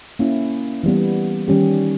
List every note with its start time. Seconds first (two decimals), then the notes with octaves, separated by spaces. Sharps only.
0.19 A#3 C#4 E4
0.84 E3 G3 B3
1.48 D#3 G3 C#4 G4